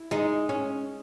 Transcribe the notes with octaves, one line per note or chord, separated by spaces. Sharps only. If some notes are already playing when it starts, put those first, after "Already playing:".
Already playing: E4
G#3 D#4
C#4